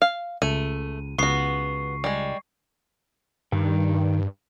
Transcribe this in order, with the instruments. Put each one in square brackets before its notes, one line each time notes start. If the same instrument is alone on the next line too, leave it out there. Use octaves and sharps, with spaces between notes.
[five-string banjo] F5
[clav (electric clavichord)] C#2 [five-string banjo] A3 [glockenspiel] D#7
[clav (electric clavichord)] C#2 F5 [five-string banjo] B3 F#4 [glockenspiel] C#6 C7
[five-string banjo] G3 G#3
[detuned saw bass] G2 [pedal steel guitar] D#3